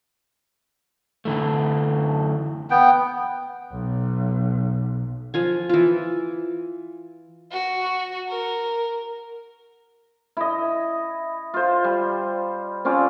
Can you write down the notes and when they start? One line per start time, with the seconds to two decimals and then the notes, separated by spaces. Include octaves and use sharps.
1.25 D3 E3 A3
2.71 B3 G5
3.71 B1
5.34 F3 F4 G#5
5.69 E3 F4
7.52 F#4
8.29 A#4
10.37 E4 D#5
11.54 F4 C5
11.84 G3
12.85 C4 C#4 F4 D5